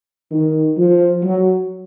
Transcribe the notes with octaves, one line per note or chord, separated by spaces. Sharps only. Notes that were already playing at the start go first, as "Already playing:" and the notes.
D#3
F3
F#3